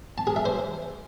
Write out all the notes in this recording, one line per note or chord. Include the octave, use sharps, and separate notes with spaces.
A5
G#4
E5
C5